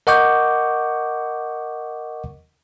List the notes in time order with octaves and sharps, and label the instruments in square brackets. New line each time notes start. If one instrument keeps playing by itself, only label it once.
[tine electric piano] A#4 D#5 F#5 C#6 D6 G6